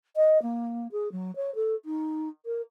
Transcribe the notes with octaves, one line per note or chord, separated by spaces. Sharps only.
D#5
A#3
G#4
F#3
C#5
A4
D#4
A#4